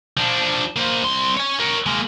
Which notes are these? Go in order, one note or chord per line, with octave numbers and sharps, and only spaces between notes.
F3 D4
A#3 C5
C2 C6
C#5 G#5
A#4 C#5
G#3 A#3